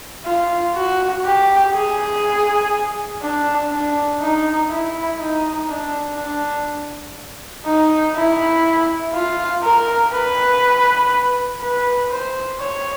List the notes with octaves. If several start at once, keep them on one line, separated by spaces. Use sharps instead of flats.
F4
F#4
G4
G#4
D4
D4
D#4
E4
D#4
D4
D4
D#4
E4
F4
A#4
B4
B4
C5
C#5